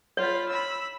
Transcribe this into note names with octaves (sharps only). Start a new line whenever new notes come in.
F4 C#5 B5
B5 E6